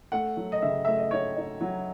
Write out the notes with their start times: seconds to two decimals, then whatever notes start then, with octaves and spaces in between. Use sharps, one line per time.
0.12 A3 F#5
0.37 F#3
0.52 D#5
0.62 C#3 E5
0.85 A3 E5
0.98 D#5
1.11 D#4 C#5
1.37 D#4
1.61 F#3